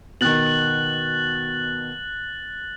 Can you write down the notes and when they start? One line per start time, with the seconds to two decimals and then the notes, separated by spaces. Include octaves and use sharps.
0.21 B2 D#3 F#6 A6 F#7